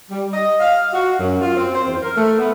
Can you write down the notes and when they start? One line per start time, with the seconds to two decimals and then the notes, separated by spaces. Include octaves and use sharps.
0.11 G3
0.33 D#5
0.60 F5
0.94 F#4
1.20 F#2
1.42 F4
1.57 C4
1.75 C5
1.88 E2
2.02 A#4
2.17 A3
2.39 B3